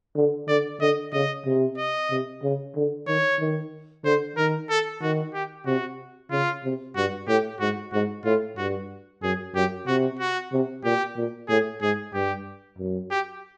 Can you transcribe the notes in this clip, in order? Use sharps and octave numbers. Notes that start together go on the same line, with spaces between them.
D3
D3 D5
D3 D#5
C#3 D#5
C3
D#5
C3
C#3
D3
D#3 C#5
D#3
D3 C5
D#3 A#4
A4
D#3 F#4
G4
C3 F#4
C#3 F4
C3
G2 F#4
A2 G4
G#2 F#4
G#2 F#4
A2 F4
G2 F#4
F#2 G#4
F#2 G4
C3 F#4
F#4
C3
A#2 G4
A#2
A2 G#4
G#2 G#4
G2 G4
F#2
G4